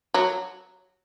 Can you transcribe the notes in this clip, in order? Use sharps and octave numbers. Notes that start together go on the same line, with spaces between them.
F#3